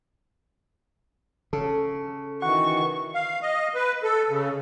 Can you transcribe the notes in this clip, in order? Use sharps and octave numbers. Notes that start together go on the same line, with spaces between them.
C#3 A4
D#3 E3 F#4 F#5 C#6
F5
D#5
B4
A4
C#3